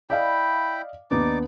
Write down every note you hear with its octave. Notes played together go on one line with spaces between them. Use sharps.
E4 D5 D#5 F5 G5 B5
D#2 B3 D4 D#4 D5 D6